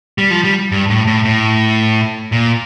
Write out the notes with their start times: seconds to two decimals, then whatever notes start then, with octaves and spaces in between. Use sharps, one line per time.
0.18 G3
0.31 F3
0.44 G3
0.72 G2
0.90 A2
1.07 A2
1.25 A2
2.32 A#2